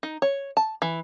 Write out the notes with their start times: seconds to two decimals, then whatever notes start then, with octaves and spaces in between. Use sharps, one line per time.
0.03 D#4
0.22 C#5
0.57 A5
0.82 E3